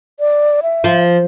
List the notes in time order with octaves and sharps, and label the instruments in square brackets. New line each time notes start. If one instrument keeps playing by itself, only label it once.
[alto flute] D5
E5
[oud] F3